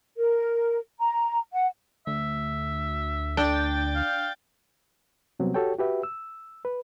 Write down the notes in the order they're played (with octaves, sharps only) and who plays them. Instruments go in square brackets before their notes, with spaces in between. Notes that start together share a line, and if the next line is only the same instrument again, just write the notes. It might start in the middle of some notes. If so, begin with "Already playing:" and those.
[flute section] A#4
A#5
F#5
[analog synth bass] D2 [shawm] E5
[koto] D4 [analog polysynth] G5 A6
[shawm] F5
[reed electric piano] C3 F#3 G3 B3 C4
F#4 G4 A4 C#5 G5
F#4 G4 B4 E5
E6
B4